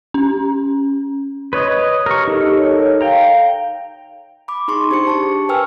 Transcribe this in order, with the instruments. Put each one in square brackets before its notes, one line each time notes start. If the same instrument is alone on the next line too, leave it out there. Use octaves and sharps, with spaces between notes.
[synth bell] C#4
[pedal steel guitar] B4 C#5 D#5
[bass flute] G4 [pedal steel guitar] A#4 C#6
[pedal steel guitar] D#4 A4 A#4
[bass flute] C#5
[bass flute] F5 [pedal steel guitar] G5 A#5
[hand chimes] B5 D6
D#4 G#4 C6 C#6
D4 G4 C5 C#6 C#7
A5 C#6
A#4 B4 G5 G#5 E6 F6